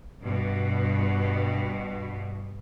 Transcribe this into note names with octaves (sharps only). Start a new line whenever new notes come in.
G2 B2